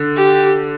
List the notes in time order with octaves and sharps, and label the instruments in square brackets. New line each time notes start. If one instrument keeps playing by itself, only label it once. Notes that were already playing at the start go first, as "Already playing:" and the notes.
Already playing: [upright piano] D3
[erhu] G4